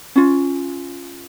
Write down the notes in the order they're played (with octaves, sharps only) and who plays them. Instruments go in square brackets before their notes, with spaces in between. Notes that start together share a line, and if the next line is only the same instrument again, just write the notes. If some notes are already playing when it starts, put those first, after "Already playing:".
[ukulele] C#4 F4